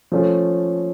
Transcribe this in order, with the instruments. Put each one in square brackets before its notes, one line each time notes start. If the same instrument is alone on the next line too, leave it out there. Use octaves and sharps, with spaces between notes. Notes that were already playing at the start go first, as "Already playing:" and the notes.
[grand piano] F3 A3 C#4 F4